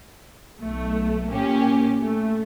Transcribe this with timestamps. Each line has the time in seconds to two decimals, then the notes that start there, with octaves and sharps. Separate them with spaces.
0.60 B1 A3
1.31 A#2 A#3 C#4 G4
2.00 A3